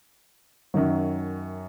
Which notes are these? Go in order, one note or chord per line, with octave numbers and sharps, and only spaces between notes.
F#2 D#3 F#3